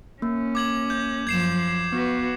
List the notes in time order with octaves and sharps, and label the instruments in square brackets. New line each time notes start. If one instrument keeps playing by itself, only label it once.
[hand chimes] A#3 [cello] C#4
[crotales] D6 G#6 F#7
G6
[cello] F#2 F3 [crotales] G#6 C7 E7
[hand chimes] B3 [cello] F#4 B4